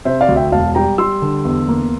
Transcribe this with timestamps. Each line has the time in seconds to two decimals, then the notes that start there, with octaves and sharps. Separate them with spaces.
0.05 C3 C5 E5
0.21 D5 F5
0.29 D2
0.36 E5 G5
0.52 E1 F5 A5
0.75 G3 G5 A#5
0.98 G3 C6 E6
1.22 D3
1.45 E2
1.68 A#3